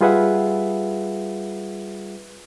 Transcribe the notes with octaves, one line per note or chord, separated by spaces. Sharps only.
G3 F4 G#4 B4 E5 F#5